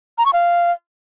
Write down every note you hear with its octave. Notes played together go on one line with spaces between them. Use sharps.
A#5
C#6
F5